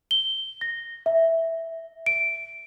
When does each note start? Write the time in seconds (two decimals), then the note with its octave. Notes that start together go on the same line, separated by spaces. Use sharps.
0.11 G7
0.61 A#6
1.06 E5
2.06 D7